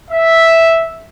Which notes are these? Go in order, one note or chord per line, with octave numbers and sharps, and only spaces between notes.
E5